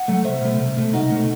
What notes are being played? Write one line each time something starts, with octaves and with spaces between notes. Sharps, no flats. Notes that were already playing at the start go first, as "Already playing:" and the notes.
Already playing: F#5
F#3 A3
C2 C5 E5
B2 A3
C2
B2 A3
C2 D#4 F#4
B2 A3